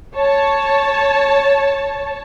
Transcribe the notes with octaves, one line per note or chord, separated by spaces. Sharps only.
C#5 A5